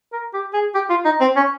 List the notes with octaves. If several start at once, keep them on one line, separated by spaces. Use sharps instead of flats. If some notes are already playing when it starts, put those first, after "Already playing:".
A#4
G4
G#4
G4
F4
D#4
C4
C#4